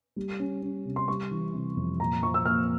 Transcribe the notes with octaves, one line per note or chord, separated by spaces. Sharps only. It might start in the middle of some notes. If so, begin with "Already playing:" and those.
G3
C#4
C#4
C3
C6
G3 C#6
E3
C3
F2
A#2 A#5
F3 C#6
E6
A#3 F6